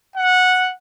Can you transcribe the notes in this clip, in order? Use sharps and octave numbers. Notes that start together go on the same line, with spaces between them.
F#5